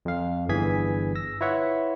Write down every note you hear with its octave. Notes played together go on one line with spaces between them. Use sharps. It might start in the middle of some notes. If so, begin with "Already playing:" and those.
F2 F5
G1 G2 E3 G#4 G#6 B6
E6 A#6
E4 F4 B4 C#5 E5 F#5